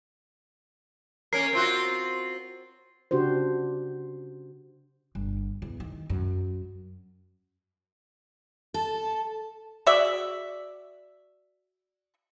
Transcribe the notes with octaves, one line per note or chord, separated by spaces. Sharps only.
A#3 C#4 A#4 C7
C4 F4 F#4
C#3 D4 F#4 G4 C5
G1
E2
D#3
F#2
A4 A5
F#4 G#4 D5 E5